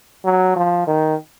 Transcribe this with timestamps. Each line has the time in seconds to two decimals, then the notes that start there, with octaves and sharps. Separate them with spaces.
0.25 F#3
0.56 F3
0.87 D#3